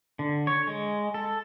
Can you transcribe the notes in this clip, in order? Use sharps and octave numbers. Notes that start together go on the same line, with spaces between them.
D3
C#5
G#3
A4